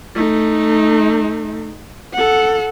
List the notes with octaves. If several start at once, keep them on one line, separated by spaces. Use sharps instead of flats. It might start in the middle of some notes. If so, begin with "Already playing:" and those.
A3 D#4
A4 F#5